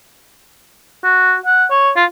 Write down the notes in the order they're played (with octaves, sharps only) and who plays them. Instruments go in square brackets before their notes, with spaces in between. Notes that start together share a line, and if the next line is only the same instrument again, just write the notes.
[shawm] F#4
F#5
C#5
F4